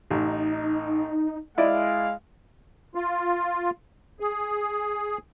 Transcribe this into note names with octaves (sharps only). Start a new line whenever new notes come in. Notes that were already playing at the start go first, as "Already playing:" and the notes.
A1 D#4
G#3 E4 D5 D#5 F5
F4
G#4